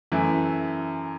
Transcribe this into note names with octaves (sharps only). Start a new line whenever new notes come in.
F#2 E3 A3 E4